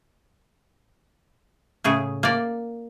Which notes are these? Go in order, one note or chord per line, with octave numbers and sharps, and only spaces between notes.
A2 C#3 G#4
A#3 D5